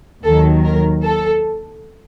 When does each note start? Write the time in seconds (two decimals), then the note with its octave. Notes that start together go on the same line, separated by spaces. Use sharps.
0.24 D#2 D#3 F#3 A4
0.64 A#4
1.04 A4